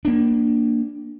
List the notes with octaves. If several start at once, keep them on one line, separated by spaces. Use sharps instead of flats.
A#3 D4